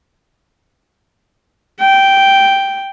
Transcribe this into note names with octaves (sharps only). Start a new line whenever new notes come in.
G5